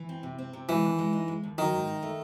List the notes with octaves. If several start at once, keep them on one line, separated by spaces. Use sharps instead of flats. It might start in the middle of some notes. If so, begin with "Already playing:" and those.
Already playing: E3
C4
C3
C4
C3
E3 G#3
D#2
G#3
D#4
G#3
D#2
D#3 F#3
G#2
D#4
A3